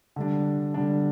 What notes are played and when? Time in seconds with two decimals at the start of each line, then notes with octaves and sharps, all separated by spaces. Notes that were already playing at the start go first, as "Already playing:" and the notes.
0.16 D3 G3 D4
0.74 D3 G3 D4